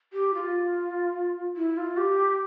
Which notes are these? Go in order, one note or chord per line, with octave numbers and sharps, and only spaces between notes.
G4
F4
E4
F4
G4